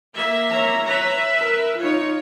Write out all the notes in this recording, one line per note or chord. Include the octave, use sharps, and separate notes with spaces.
A#3 E5
C#5 A#5
B4 E5
A#4
D#4 F4 C#5